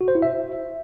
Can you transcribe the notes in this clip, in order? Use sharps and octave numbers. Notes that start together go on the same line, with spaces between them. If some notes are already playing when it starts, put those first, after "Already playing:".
F#4
C5
E4
E5